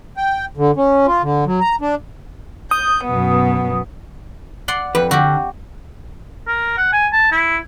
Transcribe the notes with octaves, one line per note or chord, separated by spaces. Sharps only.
G5
D3
C#4
F4
D3
F#3
A#5
D4
D#6 G6
F#2 B2 B3
D5 F#5 C6
F2 B4
D3 F#4 G4
A#4
F#5
G#5
A5
E4